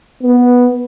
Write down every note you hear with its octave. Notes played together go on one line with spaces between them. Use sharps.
B3